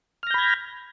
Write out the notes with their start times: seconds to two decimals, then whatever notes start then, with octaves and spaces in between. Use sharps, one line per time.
0.23 F6
0.27 A#6
0.30 G6
0.34 B5
0.38 G#6